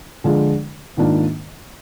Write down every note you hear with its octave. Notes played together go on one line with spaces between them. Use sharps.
D3 F3 G#3 D4 F4
G#2 D#3 A#3 D4 F4